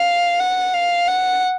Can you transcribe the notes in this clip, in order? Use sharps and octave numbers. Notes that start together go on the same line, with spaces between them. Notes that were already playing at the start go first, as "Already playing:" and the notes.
Already playing: F5
F#5
F5
F#5